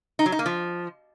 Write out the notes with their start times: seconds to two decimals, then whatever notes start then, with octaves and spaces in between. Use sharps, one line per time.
0.19 D#4
0.26 F#3
0.32 D#4
0.39 A#3
0.46 F3